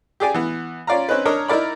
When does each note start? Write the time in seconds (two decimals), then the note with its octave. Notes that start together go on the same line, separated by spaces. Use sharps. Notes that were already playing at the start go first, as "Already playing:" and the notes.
0.20 G4 G#4 D5 G#5
0.34 E3 B3
0.87 C#4 F4 D5 F5 A#5
1.09 C4 C#4 D#4 B4
1.25 D4 A#4 C#5 D#5
1.48 D#4 E4 A#4 D5 B5